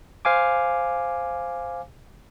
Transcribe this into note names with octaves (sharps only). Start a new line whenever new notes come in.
C5 F5 G#5 D6